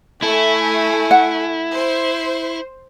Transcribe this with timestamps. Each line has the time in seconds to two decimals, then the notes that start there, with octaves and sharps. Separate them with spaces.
0.22 A3 E4 G#5
1.11 F#5
1.75 C5